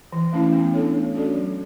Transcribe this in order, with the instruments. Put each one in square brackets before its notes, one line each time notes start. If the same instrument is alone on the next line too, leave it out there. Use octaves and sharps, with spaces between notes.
[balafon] E3
A3 C#4 E4
B3
D4 A4 C#5
A3
C#4 F#4 A4 D5
F#3